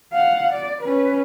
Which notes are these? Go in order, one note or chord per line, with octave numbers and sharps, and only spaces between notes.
F5 F#5
D5
C#4 B4